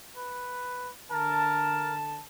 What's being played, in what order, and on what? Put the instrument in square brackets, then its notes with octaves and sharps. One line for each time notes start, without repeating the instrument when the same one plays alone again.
[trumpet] B4
[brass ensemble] D3 A5 [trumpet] A#4